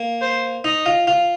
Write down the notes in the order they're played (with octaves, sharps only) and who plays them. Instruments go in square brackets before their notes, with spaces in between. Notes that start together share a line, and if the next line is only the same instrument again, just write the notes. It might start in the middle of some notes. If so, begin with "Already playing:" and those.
Already playing: [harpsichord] A#3
[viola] C5
[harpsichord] D#4 [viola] D#5
[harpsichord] F4
F4